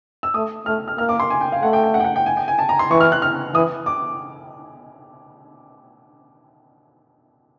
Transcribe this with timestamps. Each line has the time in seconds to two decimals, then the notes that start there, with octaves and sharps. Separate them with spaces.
0.23 E6
0.34 A3 D#6
0.66 A3 F6
0.88 F6
0.98 A#3 F6
1.09 D6
1.20 C6
1.30 G#5
1.41 G5
1.52 F5
1.62 A3 F#5
1.73 G5
1.84 G5
1.94 F#5
2.00 G5
2.04 F#5
2.16 G5
2.26 G#5
2.37 G5
2.48 G#5
2.59 A5
2.69 A#5
2.79 C6
2.91 E3 C#6
3.00 F6
3.12 F#6
3.22 F6
3.54 E3 D#6
3.86 D6